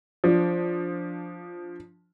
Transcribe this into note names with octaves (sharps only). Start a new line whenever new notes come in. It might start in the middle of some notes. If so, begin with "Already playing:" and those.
F3 D4